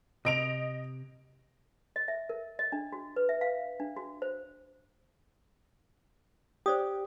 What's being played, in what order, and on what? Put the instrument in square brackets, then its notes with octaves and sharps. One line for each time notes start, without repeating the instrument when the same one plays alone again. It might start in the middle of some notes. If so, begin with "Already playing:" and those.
[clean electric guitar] C3 [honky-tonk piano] D#5 D7 F7
[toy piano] D#5
E5
A#4
D#5
D4
F#4
B4
E5
F5
D4
F#4
C5
[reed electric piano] G4 [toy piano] C5 D5 D#6